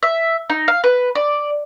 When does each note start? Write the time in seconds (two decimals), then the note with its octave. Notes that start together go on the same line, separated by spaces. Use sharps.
0.03 E5
0.50 D#4
0.68 F5
0.84 B4
1.15 D5